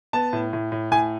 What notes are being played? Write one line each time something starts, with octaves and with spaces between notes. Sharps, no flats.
B3 A5
A2
A2
A2
A2 G#5